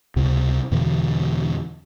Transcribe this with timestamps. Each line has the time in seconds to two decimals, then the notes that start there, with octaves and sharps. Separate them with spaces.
0.16 C#2 C3
0.71 E2 B2 D3 E3